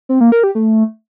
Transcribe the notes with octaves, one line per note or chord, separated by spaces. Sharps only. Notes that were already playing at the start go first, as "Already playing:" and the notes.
C4
A#3
A#4
G4
A3